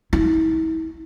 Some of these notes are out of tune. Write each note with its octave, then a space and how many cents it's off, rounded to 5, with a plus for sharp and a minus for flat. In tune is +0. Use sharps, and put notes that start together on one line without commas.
E4 -40